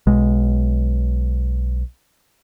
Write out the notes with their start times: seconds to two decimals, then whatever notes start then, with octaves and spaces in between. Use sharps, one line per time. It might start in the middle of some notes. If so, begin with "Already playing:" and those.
0.07 B1 G#3